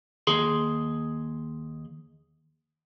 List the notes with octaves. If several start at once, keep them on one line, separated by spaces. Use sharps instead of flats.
D#2 G#4 C6